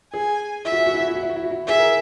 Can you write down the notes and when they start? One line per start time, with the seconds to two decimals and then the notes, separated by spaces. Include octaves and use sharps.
0.13 G#4 G#5
0.65 E4 E5
0.72 F#4
0.80 E4
0.86 F#4
0.94 E4
1.01 F#4
1.08 E4
1.16 F#4
1.23 E4
1.29 F#4
1.36 E4
1.44 F#4
1.51 E4
1.67 G#4 E5
1.79 A#4